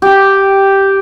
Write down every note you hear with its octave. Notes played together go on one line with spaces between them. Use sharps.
G4